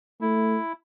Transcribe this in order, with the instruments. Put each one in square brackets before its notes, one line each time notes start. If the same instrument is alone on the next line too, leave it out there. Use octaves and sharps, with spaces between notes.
[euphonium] A3 [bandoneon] E4